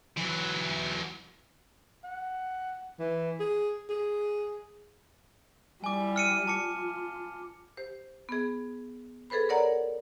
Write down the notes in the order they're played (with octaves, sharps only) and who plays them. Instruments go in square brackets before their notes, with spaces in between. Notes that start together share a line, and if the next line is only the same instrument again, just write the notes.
[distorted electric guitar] E3 F#3
[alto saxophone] F#5
E3
G#4
G#4
[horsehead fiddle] G3 E4 [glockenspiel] G#5 D6
[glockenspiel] F6 C#7 D#7
[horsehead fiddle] F4 [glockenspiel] A5 D6 C#7
[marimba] G4 C5
B3 G#4
G#4 A4 B4 C5 B5
A#4 C#5 D5 F#5 A#5